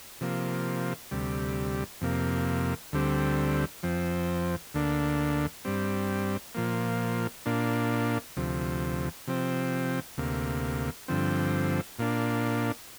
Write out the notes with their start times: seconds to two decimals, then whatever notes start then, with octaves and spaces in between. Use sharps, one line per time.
0.21 C3 F3 A#3
1.11 D2 C3 G3
2.01 F2 C3 A#3
2.93 D2 D3 G3 C4
3.83 F2 F3 C4
4.74 D2 D3 A#3 D4
5.65 G2 G3 C4
6.55 A#2 F3 A#3
7.46 A#2 A#3 D4
8.37 D2 C3 F3
9.27 C3 F3 C4
10.18 D2 C3 A#3
11.08 G2 D3 F3 C4
11.99 A#2 A#3 D4